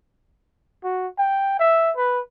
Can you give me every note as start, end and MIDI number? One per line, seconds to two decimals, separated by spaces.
0.84 1.07 66
1.18 1.58 79
1.59 1.91 76
1.97 2.20 71